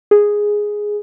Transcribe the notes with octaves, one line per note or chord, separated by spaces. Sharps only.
G#4